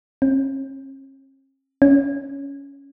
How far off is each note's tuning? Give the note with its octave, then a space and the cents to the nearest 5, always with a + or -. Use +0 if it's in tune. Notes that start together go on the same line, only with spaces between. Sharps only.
C#4 -45
C#4 +10